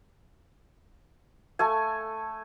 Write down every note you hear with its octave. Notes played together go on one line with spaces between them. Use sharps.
A3 A4 G#5